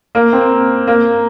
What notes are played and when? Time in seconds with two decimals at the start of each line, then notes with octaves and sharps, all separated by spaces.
0.15 A#3
0.33 C4
0.87 A#3